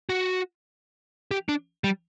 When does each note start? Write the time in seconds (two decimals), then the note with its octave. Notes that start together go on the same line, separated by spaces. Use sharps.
0.09 F#4
1.31 G4
1.49 D4
1.84 G3